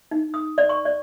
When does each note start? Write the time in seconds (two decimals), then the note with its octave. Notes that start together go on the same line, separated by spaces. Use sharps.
0.11 D#4
0.34 D#6
0.58 D5
0.69 C#6
0.85 D5